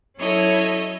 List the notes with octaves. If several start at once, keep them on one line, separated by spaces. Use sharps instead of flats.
F#3 C#4 E4 A4 C#5 D#5